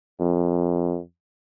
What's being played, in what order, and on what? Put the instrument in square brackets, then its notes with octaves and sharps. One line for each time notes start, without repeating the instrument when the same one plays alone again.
[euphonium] F2